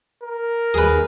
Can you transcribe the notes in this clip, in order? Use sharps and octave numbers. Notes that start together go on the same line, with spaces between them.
A#4
D#2 G#4 B4